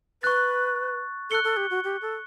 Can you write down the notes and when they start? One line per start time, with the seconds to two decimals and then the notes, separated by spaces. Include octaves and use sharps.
0.23 B4 C#6 F#6 A6
1.30 A4 F#6 C#7 G7
1.44 A4
1.57 G4
1.70 F#4
1.84 G4
2.02 A4